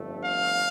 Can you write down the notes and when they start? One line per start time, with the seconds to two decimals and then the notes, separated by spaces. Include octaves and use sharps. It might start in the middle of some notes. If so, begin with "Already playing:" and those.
Already playing: G1 F2 D3 A3
0.24 F5